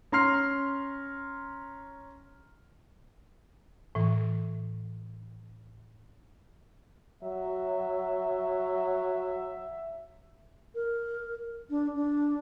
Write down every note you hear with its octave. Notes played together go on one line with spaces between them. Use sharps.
C#4 A#5 C6 F6 C7
A2 E3
F#3 E5
A#4
D4
D4